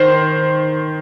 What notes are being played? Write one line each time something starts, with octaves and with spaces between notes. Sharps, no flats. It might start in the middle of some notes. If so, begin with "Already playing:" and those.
Already playing: D#3 C5